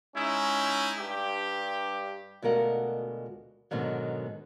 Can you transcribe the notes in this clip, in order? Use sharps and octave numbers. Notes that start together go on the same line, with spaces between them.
G#3 C#4 D#4 E4
G2 G4
D2 B2 G#3 F4 A#4 F#5
G#2 B2 D3 D#3 F#3